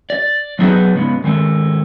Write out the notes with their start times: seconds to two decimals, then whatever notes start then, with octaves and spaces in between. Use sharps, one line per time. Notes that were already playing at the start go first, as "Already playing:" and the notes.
0.10 D5
0.59 F#3 B3 D4 D#4 G#4 B4
0.95 C#3 G#3 B3
1.24 D#3 G#3 A3